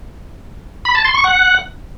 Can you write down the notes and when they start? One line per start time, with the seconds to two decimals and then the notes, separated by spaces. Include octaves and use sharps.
0.85 B5
0.95 A5
1.05 C6
1.14 C#6
1.24 F#5